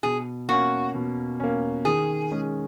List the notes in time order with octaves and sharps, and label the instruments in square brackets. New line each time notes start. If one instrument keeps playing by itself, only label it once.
[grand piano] B2 [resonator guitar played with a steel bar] G#4
[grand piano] A#3 C#4 [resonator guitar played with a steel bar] F#4
[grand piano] B2
A#3 C#4
[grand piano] D#3 [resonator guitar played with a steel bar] G#4
[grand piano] G#3 C#4